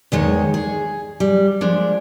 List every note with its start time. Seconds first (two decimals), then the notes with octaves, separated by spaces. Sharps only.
0.12 E2 D#3 G#3 C#5
0.54 G#4
1.20 G3
1.61 F3 G#3 D4